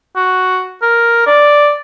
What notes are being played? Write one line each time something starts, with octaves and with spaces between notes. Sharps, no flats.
F#4
A#4
D5